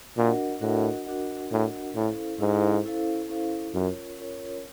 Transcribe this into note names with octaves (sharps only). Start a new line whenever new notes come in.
A#2 D4 F#4 A#4 D#5 F#5
A2 D4 F#4 A#4 D#5 F#5
D4 F#4 A#4 D#5 F#5
A2 D4 F#4 A#4 D#5 F#5
A2 C#4 E4 A4 C5 F5
G#2 C#4 E4 A4 C5 F5
C#4 E4 A4 C5 F5
C#4 E4 A4 C5 F5
F#2 C#4 F4 A#4 C#5
C#4 F4 A#4 C#5